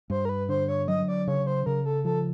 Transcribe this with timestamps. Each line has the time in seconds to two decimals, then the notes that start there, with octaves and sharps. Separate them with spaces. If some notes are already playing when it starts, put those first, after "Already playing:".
0.10 G2 C5
0.25 A#4
0.29 B4
0.49 D3 C5
0.69 C#5
0.88 F#3 D#5
1.08 D5
1.27 C#3 C#5
1.47 C5
1.66 C#3 A#4
1.86 A4
2.05 F3 A4